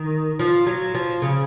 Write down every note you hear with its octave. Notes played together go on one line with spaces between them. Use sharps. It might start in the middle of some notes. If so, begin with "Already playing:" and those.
Already playing: D#3
F3
F#3
F3
C#3